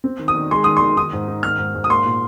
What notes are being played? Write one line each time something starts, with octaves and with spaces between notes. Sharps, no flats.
C4
D#3
D#6
D#3
G#3 C6
D#3 D#6
D#3 C6
D#3 D#6
G#2
D#4
D#3 F6
G#2
G#2
D#6
A#3 C6
A#2